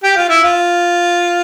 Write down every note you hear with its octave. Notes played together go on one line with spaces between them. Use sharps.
G4
F4
E4
F4